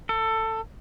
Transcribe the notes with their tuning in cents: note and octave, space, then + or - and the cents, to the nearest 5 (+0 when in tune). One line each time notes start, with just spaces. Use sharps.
A4 +20